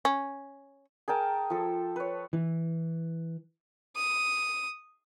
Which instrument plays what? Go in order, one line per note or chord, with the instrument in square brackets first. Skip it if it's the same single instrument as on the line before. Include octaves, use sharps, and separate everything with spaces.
[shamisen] C#4
[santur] G#4 A#4 G5 A5
F3 A4
B4 C#5
[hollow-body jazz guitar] E3
[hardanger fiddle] D#6